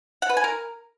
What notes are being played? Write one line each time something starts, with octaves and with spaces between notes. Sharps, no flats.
F#5
B4
G#5
A#4